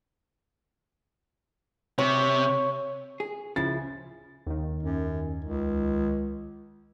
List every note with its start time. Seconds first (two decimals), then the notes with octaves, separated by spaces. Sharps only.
1.98 C3 C#5
3.20 G#4
3.56 C#3 F3 E4 A6
4.47 D#2 D#3
4.83 F#2
5.45 C#2